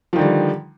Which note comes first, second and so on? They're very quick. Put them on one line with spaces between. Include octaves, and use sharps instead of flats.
F3 D#3 D3 G3